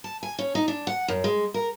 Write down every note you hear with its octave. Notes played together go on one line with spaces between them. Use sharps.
A5
G#5
C#4
D#4
D4
F#5
F#2
G#3
A#4